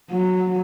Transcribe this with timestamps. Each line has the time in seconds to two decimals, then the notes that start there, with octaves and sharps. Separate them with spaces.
0.11 F#3